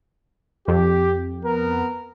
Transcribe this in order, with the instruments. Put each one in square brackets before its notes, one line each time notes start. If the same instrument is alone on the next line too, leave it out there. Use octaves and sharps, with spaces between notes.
[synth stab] F2 [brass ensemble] G4
[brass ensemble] B3 A#4